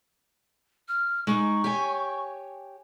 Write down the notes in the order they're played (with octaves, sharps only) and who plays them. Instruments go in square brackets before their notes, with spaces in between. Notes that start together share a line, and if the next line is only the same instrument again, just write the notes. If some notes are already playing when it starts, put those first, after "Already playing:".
[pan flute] F6
[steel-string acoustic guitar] G#3 D#4 [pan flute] C#6
[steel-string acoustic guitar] G4 C#5 G#5